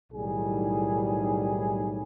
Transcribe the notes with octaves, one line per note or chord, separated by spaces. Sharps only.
B1 A2 D#3 G3 G#4